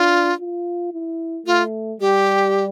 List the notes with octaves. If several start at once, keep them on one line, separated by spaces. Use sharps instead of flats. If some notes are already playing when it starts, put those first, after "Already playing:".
Already playing: D4 F4
F4
E4
A3 F4
G3 G4